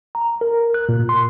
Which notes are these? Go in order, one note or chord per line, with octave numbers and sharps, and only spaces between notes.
A#5
A#4
F#6
A#2
C6